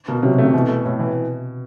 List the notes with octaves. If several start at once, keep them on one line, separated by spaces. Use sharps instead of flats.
B2 A#3
C3 F#3
C3 A3
B2 E3
A3
A2
E3